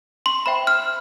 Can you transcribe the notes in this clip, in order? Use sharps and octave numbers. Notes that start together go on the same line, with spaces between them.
C6
C5 E5 G5 B5
F6